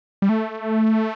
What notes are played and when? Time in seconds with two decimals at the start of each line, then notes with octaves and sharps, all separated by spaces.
0.22 G3
0.29 A3